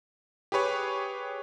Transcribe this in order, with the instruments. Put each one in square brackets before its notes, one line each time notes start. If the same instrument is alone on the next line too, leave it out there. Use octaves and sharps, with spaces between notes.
[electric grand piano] G4 G#4 B4 C#5